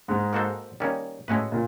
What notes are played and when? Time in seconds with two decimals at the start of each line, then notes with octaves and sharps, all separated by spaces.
0.08 G#2 G#3
0.33 A#3 D#4 F#4 A4 C5
0.80 D#3 G3 A#3 C#4
1.28 A2 G#3 A3 C#4 F#4 B4
1.52 A#2 A#3